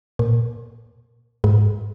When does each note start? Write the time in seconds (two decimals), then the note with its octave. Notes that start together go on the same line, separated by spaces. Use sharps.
0.19 A#2
1.44 G#2